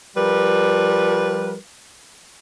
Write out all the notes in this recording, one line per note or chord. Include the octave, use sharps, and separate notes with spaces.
F3 G3 A#4 B4